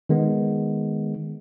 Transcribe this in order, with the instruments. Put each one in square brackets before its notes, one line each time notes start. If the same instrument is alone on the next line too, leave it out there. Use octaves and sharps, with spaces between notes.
[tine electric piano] D#3 G#3 B3